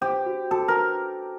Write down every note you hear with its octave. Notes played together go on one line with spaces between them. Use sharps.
G4 C5
F#4
F#4 A4
A#4